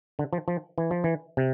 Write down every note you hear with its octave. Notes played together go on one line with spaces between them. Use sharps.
D3
F3
F3
E3
F3
E3
C3